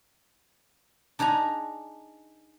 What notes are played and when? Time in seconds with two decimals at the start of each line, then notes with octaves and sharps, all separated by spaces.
1.19 D4 D#4 G#4 G#5 A#5